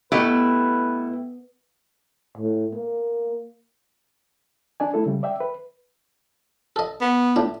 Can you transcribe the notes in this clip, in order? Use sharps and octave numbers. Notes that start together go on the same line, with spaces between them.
B2 A3 E4 G4 B4
A2
A#3
D4 D5 G#5
A3 E4 A4
C#3 G3
D5 E5 G5
B4
A4 D#5
B3
A2 D4